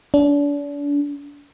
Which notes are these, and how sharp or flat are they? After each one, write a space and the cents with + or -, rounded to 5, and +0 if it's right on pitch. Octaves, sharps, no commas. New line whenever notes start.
D4 -35